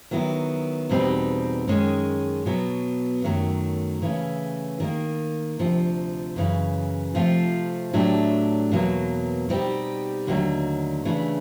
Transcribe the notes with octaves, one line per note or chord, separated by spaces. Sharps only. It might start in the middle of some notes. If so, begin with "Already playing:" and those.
D#3 F#3 B3 E4
E2 B2 G3 C4 D#4
F#2 D#3 G#3 C#4
B2 F#3 B3
F#2 D#3 F#3 A3
C#3 E3 A3 C#4
D#3 G3 A#3
D2 C3 F3
F#2 C#3 E3
C3 F3 A3 C4 F4
A2 F#3 A3 D4 G4
E2 B2 F#3 A#3
B2 G3 C4 D#4 G4
D#2 D3 F#3 A3
C#3 E3 A3 D4